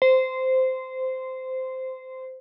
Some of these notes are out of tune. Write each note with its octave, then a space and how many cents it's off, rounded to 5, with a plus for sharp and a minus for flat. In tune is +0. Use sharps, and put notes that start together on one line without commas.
C5 -15